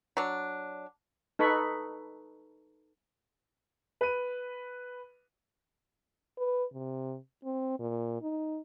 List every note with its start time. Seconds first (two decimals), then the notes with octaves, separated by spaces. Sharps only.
0.17 F#3 D4
1.39 D#4 A4 B4 B5 C#6
4.01 B4 D#7
6.38 B4
6.73 C3
7.44 C4
7.80 A#2
8.22 D#4